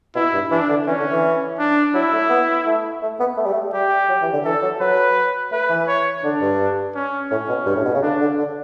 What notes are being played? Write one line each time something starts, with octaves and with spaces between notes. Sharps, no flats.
B2 E4
G2
E3 D4
D3
E3 C#4
D3
E3
D4
F#3 E4
A3
B3
A3
A3
B3
A3
G3
A3
G3 G4
F#3
E3
D3
E3 A4
F#3
F#3 B4
A3 B4
E3
C#5
D3 D4
G2
C#4
A2 C#4
B2
G2
A2
B2
C#3
D3 D4
D3
D3